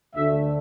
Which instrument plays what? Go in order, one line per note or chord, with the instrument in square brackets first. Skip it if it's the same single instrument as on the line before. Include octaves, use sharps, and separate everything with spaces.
[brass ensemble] D2 D3 A3 E5